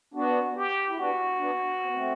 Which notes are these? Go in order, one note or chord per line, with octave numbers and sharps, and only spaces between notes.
B3 D4 F#4
G4
E4
B3 D4 F#4
B3 D4
C4
B3
A3 C4